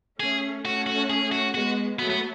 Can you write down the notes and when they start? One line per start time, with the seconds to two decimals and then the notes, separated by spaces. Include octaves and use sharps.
0.20 A3 C#4 G#4
0.65 A3 C#4 F#4
0.87 F#4
1.10 G#4
1.32 F#4
1.54 G#3 B3 F#4
1.99 F#3 A3 B3
2.10 B3